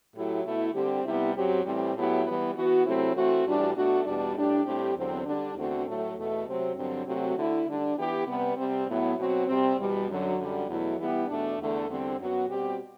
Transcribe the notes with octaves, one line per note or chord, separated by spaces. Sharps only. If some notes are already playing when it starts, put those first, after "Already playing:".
A2 F#3 A3 E4 G4
B2 A3 E4
D3 G3 C4 G4
C3 G3 B3 E4 G4
F#2 F#3 C4 G4
A2 E3 G3 C4
A2 F#3 B3 E4 G4
E3 G3 B3
E3 B3 F#4
C3 F#3 A3 C4 E4
E3 A3 C4 F#4
A2 E3 G3 D4 F#4
B2 A3 D4 F#4
E2 B2 G3 D4
A2 G3 D4 G4
A2 G3 C4 G4
E2 D3 F#3 C4
D3 G3 D4
E2 D3 A3 C4 F#4
A2 F#3 A3
E2 B2 A3
C3 F#3 C4
G2 D3 F#3 C4
C3 F#3 A3 C4 F#4
D3 A3 E4
D3 G3 D4
E3 B3 E4 G4
C3 G3 B3
C3 G3 C4
A2 F#3 B3 E4
B2 F#3 C4 F#4
C3 G3 C4
E2 B2 G3
F#2 D3 F#3
F#2 D3 G3
E2 B2 F#3 A3 E4
E3 G3 B3 E4 G4
E2 B2 A3 D4
E2 D3 A3
E2 D3 G3 C4
F#2 F#3 B3 F#4
B2 G3 C4 G4